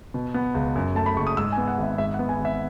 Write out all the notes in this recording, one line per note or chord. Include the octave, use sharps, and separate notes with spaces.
B2
B3
C#2
F#2
A3 A5
B5
F#1 C#6
D#6
G#2 E6
G#5
B3
F#5
G#1
E5
G#2 E5
F#5
B3
G#5
G#1
E5